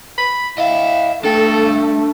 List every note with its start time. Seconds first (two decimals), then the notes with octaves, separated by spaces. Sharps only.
0.18 B5
0.58 E4 D#5 F5
1.24 A3 D4 A4 G5